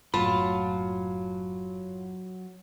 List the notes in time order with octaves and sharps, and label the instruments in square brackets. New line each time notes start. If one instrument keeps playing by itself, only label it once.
[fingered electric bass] F#1 A2 [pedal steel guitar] F#3 [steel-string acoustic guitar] F4 A5 [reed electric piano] B5